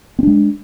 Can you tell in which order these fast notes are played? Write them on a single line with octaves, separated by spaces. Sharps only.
C4 D4 G#3